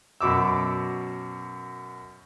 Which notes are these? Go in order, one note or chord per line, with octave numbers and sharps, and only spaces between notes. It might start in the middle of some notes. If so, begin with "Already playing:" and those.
F#2 B2 D6 E6